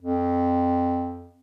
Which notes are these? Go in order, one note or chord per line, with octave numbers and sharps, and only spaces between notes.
F2